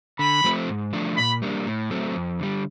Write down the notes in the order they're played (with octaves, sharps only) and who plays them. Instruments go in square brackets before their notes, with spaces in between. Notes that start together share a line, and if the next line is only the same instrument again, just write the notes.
[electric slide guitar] D3 [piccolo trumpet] B5
[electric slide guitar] F3 A3 C4
G#2
F3 A3 D4
[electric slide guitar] A#2 [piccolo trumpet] B5
[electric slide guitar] G3 A#3 D4
A2
F#3 A3 C4
F2
D3 G3